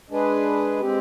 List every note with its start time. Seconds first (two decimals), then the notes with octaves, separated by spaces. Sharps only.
0.10 G#3 D4 G#4 B4
0.80 G#3 C4 G4